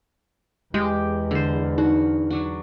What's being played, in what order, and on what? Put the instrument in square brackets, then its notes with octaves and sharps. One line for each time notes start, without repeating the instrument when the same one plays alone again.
[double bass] E2 [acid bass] G#3 [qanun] G4
[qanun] D3 C5
[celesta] D#4 [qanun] F#4
[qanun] F#3 D4 F#4